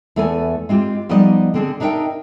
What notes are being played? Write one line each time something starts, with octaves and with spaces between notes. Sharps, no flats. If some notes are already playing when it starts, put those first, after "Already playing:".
E2 A3 A4 B4 E5 G#5
G#3 C4 F4 G4
F3 G3 B3 D#4 D5 D#5
D3 C4 G#4
D4 D#4 A#4 B4 E5 G5